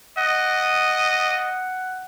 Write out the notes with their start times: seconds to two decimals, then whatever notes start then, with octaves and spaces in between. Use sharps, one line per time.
0.17 D#5 F#5